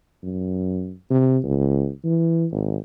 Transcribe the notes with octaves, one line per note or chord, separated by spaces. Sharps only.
F#2
C3
C#2
E3
G#1